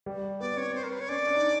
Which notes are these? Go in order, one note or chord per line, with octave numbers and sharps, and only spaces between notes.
G3
B3 D5
C4 C#5
C5
A#4
B4
C#5
C#4 D5
D4
D#4